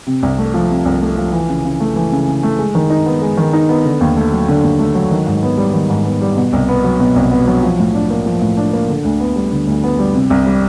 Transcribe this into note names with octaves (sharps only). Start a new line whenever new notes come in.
C3
C2
A3
F3
C3
C2
A3
F3
E3
C#3
C#3
A3
E3
C#3
C#3
A3
G#3
D#3
D#4
B3
G#3
D#3
D#4
B3
D3
D#2
A3
F#3
D3
D#2
A3
F#3
D#3
G#2
B3
G3
D#3
G#2
B3
G3
B2
C2
B3
F#3
B2
C2
B3
F#3
F3
A2
D4
A#3
F3
A2
D4
A#3
D3
D2
B3
G3
D3
D2
B3
G3
C3
C2
G3